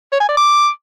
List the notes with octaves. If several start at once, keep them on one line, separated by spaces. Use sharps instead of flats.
C#5
G#5
D5
D6